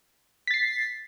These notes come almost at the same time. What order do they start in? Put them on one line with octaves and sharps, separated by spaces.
B6 A6 C7